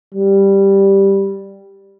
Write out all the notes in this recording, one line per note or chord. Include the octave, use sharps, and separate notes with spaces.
G3